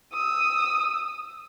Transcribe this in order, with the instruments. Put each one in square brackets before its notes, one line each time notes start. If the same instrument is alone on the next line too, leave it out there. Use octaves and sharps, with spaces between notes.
[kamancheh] D#6 E6